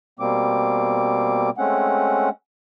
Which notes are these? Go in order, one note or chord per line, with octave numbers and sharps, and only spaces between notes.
B2 G3 A#3 C4 D6
G#3 A3 C4 C#4 F#5